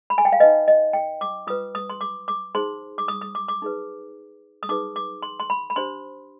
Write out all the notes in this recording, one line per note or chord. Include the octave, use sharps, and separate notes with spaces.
B5
G#5
G5
F5
D#4 B4 D#5
D#5
G5
D6
F4 B4 D#6
D#6
C6
D6
D6
D#4 G#4 C5 C6
D6
D#6
D#6
D6
D6
D#4 G#4 B4
D#6
D#4 G#4 B4 D6
D6
C6
C6
B5
B5
D4 G4 C5 C6